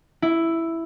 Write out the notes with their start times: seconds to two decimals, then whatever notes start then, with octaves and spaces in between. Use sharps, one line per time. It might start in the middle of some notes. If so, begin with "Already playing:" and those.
0.22 E4